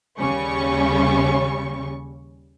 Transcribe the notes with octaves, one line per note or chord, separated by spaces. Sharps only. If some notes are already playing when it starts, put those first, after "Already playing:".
D#2 C#3 G3 C#4 C#6